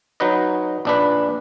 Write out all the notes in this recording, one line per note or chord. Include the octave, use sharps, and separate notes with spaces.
F#3 D#4 B4 D#5
A#1 D4 B4